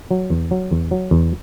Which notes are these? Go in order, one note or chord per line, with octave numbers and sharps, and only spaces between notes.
F#3
E2
F#3
E2
F#3
E2